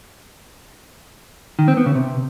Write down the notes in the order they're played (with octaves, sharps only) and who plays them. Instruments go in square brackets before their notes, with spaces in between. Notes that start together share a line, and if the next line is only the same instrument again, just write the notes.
[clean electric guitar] D#3
C4
B3
C#3
C3